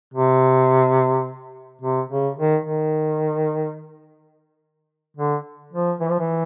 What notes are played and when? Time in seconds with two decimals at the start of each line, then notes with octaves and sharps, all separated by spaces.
0.14 C3
1.81 C3
2.09 C#3
2.37 D#3
2.65 D#3
5.17 D3
5.72 F3
6.00 E3
6.10 F3
6.19 E3